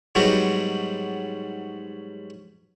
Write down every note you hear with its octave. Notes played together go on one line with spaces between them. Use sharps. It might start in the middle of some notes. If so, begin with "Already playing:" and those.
G#2 F#3 G3 B3 F#4